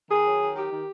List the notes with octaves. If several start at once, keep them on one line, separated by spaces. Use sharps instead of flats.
D#3 G#4
F#3
D#3
D#3 G4
D#3